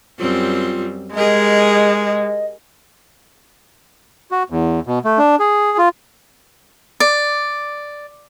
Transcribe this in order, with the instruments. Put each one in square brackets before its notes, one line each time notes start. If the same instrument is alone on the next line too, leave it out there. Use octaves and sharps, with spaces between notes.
[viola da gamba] F#2 G3 C4 [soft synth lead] F4
[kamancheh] G#3 [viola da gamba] G4 G#4 A#4 [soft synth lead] D#5
[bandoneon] F#4
E2
B2
A3
D4
G#4
F4
[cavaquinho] D5